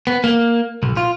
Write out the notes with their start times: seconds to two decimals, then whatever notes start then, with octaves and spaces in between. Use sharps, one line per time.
0.07 B3
0.24 A#3
0.83 B1
0.97 F4